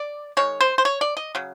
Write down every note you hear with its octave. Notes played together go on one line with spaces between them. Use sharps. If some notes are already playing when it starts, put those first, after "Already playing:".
Already playing: D5
D#3 G#3 C#5
C5
C5
C#5
D5
D#5
C#3 F#3